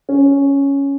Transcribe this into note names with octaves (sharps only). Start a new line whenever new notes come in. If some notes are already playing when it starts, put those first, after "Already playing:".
C#4